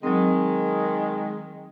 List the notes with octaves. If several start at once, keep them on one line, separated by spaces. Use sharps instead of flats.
D#3 F#3 G#3 C4